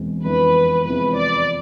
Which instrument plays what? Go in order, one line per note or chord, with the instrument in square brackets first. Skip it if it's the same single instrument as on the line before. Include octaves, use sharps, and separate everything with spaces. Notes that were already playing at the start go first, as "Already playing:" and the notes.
Already playing: [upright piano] E1 E2 B2 G#3 C4
[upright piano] F2 E3 B3 D4 [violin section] B4
[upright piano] E2 C3 F3 G#3 [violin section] B4
[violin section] D5